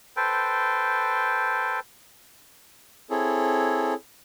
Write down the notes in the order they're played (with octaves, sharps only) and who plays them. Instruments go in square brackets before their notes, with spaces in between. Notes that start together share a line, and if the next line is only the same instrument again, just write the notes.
[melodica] A4 B4 C5 G5
[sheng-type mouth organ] C4 E4 G#4 A4 C#5